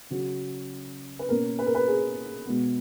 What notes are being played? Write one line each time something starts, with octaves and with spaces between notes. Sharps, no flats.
C#3 F#3 C#4 F#4
B4
B2 A#3 C#4 A#4
B4
A#4
B4
G#4
B2 G#3 B3